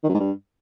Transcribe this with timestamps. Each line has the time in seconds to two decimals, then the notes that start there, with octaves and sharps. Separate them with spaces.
0.04 D#3
0.09 F#2
0.14 G#2
0.20 G2